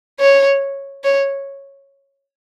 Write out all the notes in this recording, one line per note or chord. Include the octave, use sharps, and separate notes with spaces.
C#5
C#5